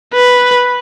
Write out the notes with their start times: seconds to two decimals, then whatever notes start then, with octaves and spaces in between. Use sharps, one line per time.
0.14 B4